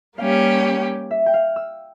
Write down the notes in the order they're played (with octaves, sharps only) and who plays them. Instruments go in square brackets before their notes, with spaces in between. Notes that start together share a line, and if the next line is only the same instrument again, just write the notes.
[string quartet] G3 A#3 C#4 G4 [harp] F5
[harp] E5
G5
F5
E6